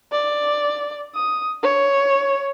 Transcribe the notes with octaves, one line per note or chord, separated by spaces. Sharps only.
D5
D#6
C#5